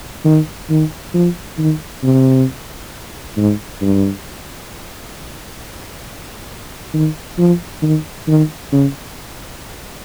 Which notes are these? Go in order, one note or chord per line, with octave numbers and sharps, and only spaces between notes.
D#3
D#3
F3
D#3
C3
G#2
G2
D#3
F3
D#3
D#3
C#3